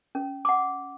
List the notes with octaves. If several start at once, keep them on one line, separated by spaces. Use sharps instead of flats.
C#4
F#5 D6